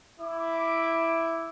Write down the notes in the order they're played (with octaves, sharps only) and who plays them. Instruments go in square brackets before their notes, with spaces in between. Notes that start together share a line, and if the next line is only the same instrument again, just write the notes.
[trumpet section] E4 D6